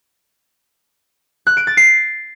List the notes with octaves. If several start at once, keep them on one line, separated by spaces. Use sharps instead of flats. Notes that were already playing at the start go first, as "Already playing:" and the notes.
F#6
D7
A6
C7